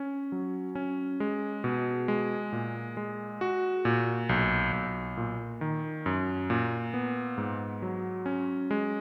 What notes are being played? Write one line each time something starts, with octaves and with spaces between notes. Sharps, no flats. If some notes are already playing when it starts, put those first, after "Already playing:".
Already playing: C#4
F#3
C#4
G#3
B2
G#3
A#2
G#3
F#4
A#2
B1
B1
A#2
D#3
F#2
A#2
B3
G#2
F#3
C#4
G#3